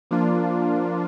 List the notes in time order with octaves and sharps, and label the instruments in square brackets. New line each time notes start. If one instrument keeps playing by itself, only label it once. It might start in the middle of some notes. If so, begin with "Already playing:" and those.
[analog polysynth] F3 A#3 D4 F4